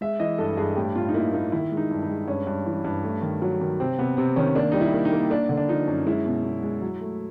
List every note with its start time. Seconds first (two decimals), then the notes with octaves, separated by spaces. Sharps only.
0.01 G#3 E5
0.20 E3 D#5
0.38 G2 A4
0.57 G2 G#4
0.76 A2 G4
0.95 A2 F4
1.09 D#4
1.14 A#3 E4
1.33 A#3 D#4
1.52 D#3 E4
1.72 G#3
1.77 D#4
1.91 G2
2.02 D#4
2.09 G#3
2.28 G2 C#4
2.47 G2
2.66 E3
2.85 G2
3.04 A3
3.22 D#3
3.42 F#3
3.61 D#3
3.80 C3 C4
3.99 C3 B3
4.17 C3 C4
4.36 D#3 C#4
4.55 A#3 D4
4.72 G3 D#4
4.81 E4
4.93 A#3
5.05 D#4
5.13 A#3
5.30 A#3 D4
5.49 D3
5.58 D4
5.69 F3 D#4
5.88 F#2
6.06 G#3 E4
6.26 B2
6.44 B2
6.63 G#3
6.82 F#3
7.01 A3